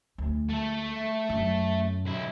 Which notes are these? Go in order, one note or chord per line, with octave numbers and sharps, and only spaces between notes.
D2
A3 A4
F#2
B1 E4